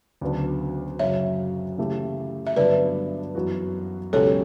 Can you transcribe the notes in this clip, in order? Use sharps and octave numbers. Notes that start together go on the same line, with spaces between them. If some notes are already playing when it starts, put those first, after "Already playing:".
D2 C#3 F#3 B3 D4
F#2 C#3 F#3 C#5 E5
C#3 E3 A3 E4 G4
E5
G2 D3 F#3 B3 D4 B4 D5
F#2 E3 B3 F#4
C#2 B2 F#3 C#4 G4 A4 C#5